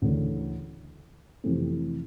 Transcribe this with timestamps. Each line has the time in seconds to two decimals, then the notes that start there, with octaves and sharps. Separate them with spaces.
0.02 D2 C#3 E3 A3 D4
1.44 F2 C3 E3 A3 C4